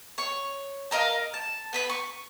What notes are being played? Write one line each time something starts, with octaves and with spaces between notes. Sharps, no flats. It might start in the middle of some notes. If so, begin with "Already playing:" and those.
C#5 C#6
A4 A#4 D#5 F5
A5
B3 B4 B5
C#6